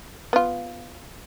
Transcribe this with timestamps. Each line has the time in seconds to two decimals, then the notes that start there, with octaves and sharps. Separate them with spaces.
0.33 B3 F4